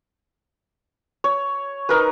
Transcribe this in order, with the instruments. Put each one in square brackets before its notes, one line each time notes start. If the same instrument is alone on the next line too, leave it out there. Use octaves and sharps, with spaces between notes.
[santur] C#5
D#4 A#4 B4